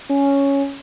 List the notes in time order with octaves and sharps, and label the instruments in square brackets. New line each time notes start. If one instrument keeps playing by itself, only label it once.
[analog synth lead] C#4